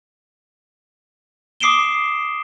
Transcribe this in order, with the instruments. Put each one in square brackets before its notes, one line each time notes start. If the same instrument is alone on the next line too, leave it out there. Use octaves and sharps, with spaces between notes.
[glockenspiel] D6 D#6 C7 D7 E7 G7